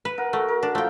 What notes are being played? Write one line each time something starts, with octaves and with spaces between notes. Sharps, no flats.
B4
A#4 F#5
A3 F#4
A#4
D4
F3 A3 F5 G5